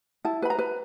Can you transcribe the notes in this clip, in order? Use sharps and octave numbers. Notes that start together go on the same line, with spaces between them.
E4 A5
B4 B5
A#5
B4